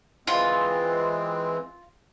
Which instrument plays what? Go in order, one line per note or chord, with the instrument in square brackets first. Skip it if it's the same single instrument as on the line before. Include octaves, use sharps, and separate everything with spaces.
[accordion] E3 G#3 C4 [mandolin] F4